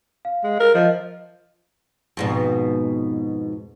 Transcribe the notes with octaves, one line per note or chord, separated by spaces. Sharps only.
F5
G#3
A#4
F3 D#5
F2 G#2 B2